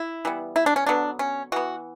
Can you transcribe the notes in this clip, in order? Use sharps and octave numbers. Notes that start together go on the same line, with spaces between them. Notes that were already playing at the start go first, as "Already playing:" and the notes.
Already playing: E4
E3 G3 B3
E4
D4
C#4
D3 F#3 B3 D4
C#4
E3 B3 F#4